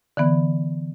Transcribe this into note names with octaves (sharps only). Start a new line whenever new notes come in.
D3 E3 B3